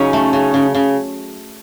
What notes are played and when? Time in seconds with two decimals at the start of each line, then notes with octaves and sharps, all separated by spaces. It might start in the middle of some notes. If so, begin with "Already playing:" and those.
Already playing: C#3 F#3 C#4 D#4
0.13 A3
0.33 C#3
0.54 C#3
0.75 C#3